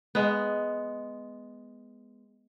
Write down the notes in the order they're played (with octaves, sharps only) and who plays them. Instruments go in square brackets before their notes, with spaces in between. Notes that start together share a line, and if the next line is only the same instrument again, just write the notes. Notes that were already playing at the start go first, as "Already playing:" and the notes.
[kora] G#3 B3